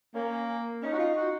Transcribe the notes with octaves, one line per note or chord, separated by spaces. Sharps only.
A#3 C#4
C#4 D#4
F#4
F4
F#4